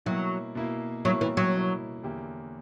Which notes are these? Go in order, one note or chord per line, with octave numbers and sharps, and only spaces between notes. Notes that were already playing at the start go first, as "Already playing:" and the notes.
B2 F#3 A#3 E4
B2 A#3 E4
B2 F#3 A#3 E4
E3
F#3
B2 A#3 E4
E2 D3 A#3 E4 G4